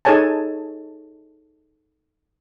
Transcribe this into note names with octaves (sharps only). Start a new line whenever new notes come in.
D#4 G#4 A4 C#5 G#5 A5